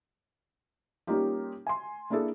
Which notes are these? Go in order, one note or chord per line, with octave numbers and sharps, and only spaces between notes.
G3 A#3 C#4 D#4 F4 G4
G#5 C6
A#3 D4 E4 G#4 A4